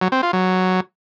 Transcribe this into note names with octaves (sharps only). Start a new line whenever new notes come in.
F#3
C4
F4
F#3